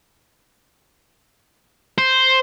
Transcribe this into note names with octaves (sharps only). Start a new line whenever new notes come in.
C5